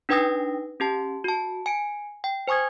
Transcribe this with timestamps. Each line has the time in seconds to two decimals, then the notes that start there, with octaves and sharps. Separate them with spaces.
0.09 D4 D#4 B4 G5 D#6 A#6
0.80 C#4 G4 A5
1.24 F#4 A5
1.66 G#5 D7
2.24 G5
2.48 C5 G#5 C#6 D#6 G#6